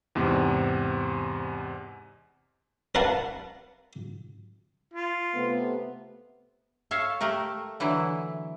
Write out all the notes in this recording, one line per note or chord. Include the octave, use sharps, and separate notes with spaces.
E2 G#2 C3
A#4 B4 F5 F#5 A5
F4
C3 A3 B3
A4 C#5 E5 F5
A3 G4 A#4
D3 E3 F#3 E4